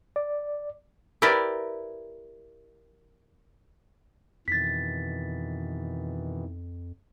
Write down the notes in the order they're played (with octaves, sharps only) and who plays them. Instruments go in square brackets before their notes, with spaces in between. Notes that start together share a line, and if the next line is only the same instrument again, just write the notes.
[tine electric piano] D5
[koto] E4 G4 A#4 B4 D5
[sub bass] F2 [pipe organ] B2 D#3 E3 [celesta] A6 B6